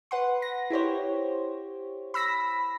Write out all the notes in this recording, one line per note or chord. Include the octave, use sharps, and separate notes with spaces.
B4 F#5 C6
A#6
E4 G4 C5 C#5
B5 E6 A#6 B6